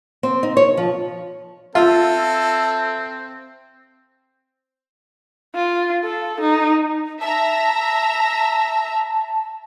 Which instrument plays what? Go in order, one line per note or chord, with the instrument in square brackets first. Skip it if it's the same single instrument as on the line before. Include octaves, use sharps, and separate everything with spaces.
[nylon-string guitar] C4
D#4
C#5
F3
[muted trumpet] C4 [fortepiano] F4 [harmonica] A4 [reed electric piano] E5
[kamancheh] F4
A4
D#4
[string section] E5 A#5 [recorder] A5